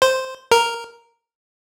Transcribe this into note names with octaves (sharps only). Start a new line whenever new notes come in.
C5
A#4